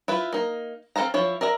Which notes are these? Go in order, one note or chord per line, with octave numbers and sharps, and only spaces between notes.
E4 F4 B4
A#3 D#4
C4 A4 C5 F5 A#5
F3 E4 C#5
A#4 D5 E5 A#5